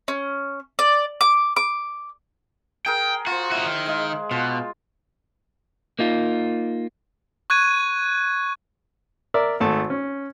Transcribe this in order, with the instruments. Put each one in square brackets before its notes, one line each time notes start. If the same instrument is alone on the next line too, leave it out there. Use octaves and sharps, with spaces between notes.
[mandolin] C#4
D5
D6
D6
[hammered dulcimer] G#4 A#4 [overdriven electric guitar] G5
[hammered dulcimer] F4 C5 [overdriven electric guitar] F#4
[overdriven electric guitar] D#4 F#4 [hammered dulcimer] E4
[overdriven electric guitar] D#3
[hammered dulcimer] G#3 F5
[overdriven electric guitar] B2 [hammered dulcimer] F4
[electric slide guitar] A#3 D#4 F4
[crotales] C#6 F#6 G#6 D#7
[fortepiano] A#4 D5 E5
G#1 A3 A5
C#4